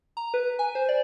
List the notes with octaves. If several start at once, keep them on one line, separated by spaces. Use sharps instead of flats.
A#5
B4
G#5
C5
D5